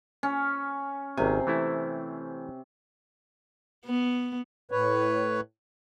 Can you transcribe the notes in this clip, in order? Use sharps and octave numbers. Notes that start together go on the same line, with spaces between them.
C#4
G#1 C3 G#5
E3 A3 E4
B3
A2 B4 C#5